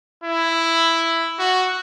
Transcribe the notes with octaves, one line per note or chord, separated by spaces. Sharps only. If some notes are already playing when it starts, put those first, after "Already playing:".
E4
F#4